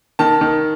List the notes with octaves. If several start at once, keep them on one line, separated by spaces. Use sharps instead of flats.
D#3 A5
D#3